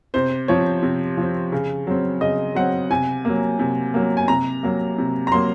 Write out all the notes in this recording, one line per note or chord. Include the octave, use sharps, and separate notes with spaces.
C3 C5
F3 C4 C#5
C3
F3 C4
C#3
F#3 C4
C#3 D#5
F#3 C4 F#5
C3 G#5
F#3 A#3
C3
F#3 A#3
G#5
C3 A#5
F#3 A#3
C3
A#5
F#3 A#3 C6